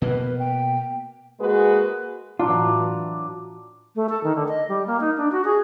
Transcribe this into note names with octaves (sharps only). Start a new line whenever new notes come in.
B2 A#3 B4
G5
G#3 A#3 F#4 G#4 B4
A2 E3 F#3 D4 F4
A3
A4
D#3
D3
D#5
G3
A#3
D#4
D4
F#4
G#4